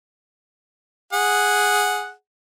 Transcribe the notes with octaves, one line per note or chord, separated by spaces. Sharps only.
G#4 F#5